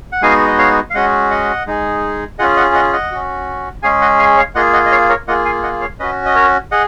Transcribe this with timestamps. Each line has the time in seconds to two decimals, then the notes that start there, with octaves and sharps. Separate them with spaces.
0.12 F#5
0.22 G#3 B3 D#4 F#4 F5 G#5
0.47 D#5
0.58 C#5 F5
0.90 F5
0.94 G#3 C#4 F#4 D#5 F#5
1.31 D#5 F#5
1.67 G#3 D#4 G#4
2.39 C#4 F4 G#4 D#5 F#5
2.56 D#5 F#5
2.75 D#5 F#5
2.93 D#5 F#5
3.12 C#4 F#4
3.83 G#3 C#4 G#4 F5 G#5
4.01 D#5 F#5
4.19 F5 G#5
4.37 C#5 F5
4.55 A#3 F4 G#4 D#5 F#5
4.73 D#5 F#5
4.86 D#5
4.91 C#5 F5
5.09 A#4 C#5
5.27 A#3 F4 G#4 D#5 F#5
5.45 F5 G#5
5.63 D#5 F#5
5.81 C#5 F5
6.00 C#4 F#4 B4 D#5
6.26 D#5
6.35 A#4 C#5
6.72 G#4 D#5 F#5